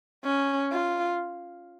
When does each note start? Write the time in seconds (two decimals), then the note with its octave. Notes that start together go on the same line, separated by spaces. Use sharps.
0.24 C#4
0.72 F4